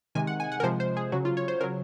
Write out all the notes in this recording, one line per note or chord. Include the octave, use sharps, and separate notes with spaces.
C3 D#3 G#3 G#5
F#5
G#5
F#5
A#4
C3 F3 G#3 C5
C5
G#4
C#3 F#3 F#4
F4
C#5
C5
C#3 F#3 A#4